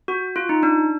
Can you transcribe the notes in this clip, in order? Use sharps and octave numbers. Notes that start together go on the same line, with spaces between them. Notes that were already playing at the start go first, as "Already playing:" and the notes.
F#4
F4
D#4
D4